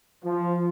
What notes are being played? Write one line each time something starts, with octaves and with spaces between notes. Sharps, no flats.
F3